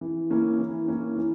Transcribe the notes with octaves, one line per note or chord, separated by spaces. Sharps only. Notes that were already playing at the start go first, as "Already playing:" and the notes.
E3
A#3 C#4 E4
E3
A#3 C#4 E4
E3